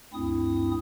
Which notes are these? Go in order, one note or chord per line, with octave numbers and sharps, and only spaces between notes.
D2 G2 C4 E4 D#6